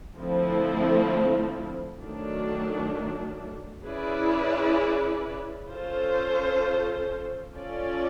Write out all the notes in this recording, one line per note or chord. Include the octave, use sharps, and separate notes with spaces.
D3 F3 A3 C4 E4
D#3 F#3 A3 D4
C#4 E4 G#4 B4 D5
C#4 F4 A4 C5
C#4 F4 A4 D5